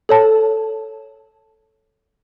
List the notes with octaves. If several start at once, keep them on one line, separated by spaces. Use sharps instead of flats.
A4 C#5 A5